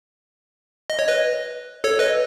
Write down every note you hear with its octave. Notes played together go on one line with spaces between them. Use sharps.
D#5
C#5
B4 D#5
A4 C#5
B4 D#5